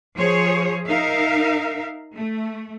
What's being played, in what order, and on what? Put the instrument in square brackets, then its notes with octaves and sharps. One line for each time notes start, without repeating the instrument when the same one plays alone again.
[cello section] F3 G#4 C5 C#5
D#4 A#4 E5 F5
A3